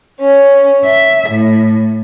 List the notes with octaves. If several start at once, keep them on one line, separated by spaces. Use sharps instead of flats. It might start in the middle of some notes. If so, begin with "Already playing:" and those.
C#4
E5
A2